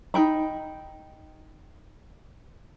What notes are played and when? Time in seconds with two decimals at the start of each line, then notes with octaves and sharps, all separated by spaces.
0.14 D#4 A#4 G5 B5